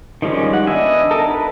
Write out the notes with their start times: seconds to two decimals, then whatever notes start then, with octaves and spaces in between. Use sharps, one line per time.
0.22 D#3 F3 G3 G#3 C#4
0.53 F#5
0.67 B3 D4 D#5 E5 G#5
1.11 D#4 A4 A#4
1.31 B4